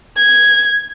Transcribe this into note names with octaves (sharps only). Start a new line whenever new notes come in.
G#6